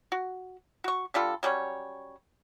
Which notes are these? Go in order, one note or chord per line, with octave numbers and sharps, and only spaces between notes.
F#4
F#4 C#6
D3 G3 F4 A4
F#3 G3 C#4 C#5